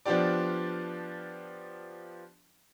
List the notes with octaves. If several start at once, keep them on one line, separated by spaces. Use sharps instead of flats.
F3 B3 D4 F4 G4 D5